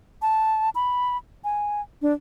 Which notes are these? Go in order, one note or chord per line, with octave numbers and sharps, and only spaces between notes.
A5
B5
G#5
D4